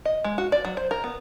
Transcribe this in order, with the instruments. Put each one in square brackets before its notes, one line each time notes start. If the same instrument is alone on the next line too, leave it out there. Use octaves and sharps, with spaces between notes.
[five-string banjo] D#5
G#3
F#4
D5
F#3
C5
A#4
B3